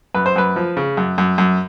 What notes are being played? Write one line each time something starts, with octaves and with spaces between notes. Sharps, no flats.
F#2 B4
C5
F#2 B4
F3
C#3
F#2
F#2
F#2